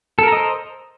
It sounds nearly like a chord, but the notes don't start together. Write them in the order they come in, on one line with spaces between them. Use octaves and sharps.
A4 A#4 A#5 D#5 C5